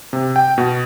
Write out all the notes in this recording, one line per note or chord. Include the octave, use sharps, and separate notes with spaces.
C3
G5
B2